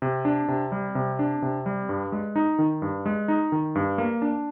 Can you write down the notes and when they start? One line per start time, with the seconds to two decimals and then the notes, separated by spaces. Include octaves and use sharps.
0.02 C3
0.25 D4
0.48 C3
0.72 G3
0.95 C3
1.19 D4
1.42 C3
1.66 G3
1.89 G2
2.12 G#3
2.36 D#4
2.59 D#3
2.82 G2
3.06 G#3
3.28 D#4
3.52 D#3
3.75 G2
3.98 A#3
4.22 D4